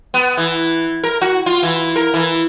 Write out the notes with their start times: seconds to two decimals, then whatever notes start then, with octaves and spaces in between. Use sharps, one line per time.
0.14 B3
0.37 E3
1.04 A#4
1.21 F#4
1.46 F4
1.63 E3
1.96 A#4
2.14 E3